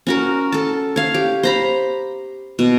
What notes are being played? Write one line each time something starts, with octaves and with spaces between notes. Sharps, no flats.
C#4 F#4 A#4
A4 A5
C#5 F5
G4
C5 A#5 B5
B2